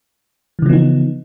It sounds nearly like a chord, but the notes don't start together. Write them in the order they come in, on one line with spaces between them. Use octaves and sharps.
E3 C#3 F3 B3 D#4